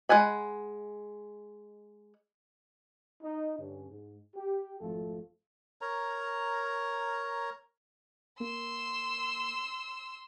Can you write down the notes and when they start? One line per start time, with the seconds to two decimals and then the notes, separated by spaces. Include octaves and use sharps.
0.09 G#3 F#5 G#5 B5
3.23 D#4
3.58 G2 D3 C#4
3.90 G#2
4.35 G4
4.81 G#1 F2 F3 A3 F4 A4
5.81 A#4 C#5 A#5
8.40 A#3 C6 E6